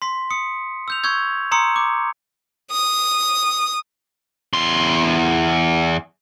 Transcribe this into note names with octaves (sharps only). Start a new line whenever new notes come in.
C6 B6
D#6 C#7
E6 G6 F7
C#6 E6 G6 G#6
A#5 C6 D#6 E6 C#7
D6
D#6
E2 C6